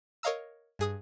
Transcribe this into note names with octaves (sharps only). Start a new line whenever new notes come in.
A#4 C#5 D#5 F5 A#5 E6
G2 G#4 D#6